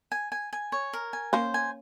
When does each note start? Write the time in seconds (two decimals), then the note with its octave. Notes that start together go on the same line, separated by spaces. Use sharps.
0.12 G#5
0.32 G#5
0.53 G#5
0.72 C#5
0.93 A#4
1.13 G#5
1.33 A#3 C#4 C5
1.54 G#5